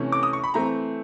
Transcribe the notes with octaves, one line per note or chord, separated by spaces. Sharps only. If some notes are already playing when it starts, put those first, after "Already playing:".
Already playing: C3 E3 A3 C#4
D6
D#6
C#6
B5
E3 A3 C4 A#5